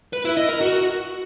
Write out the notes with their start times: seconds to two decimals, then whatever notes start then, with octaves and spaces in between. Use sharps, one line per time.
0.13 B4
0.25 E4
0.37 D#5
0.49 A#4
0.61 F#4